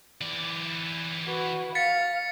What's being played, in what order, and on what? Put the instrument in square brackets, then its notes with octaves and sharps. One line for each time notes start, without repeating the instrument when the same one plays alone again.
[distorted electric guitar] E3 D5
[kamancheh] F#4 B4
[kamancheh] F5 [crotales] A6 B6 C#7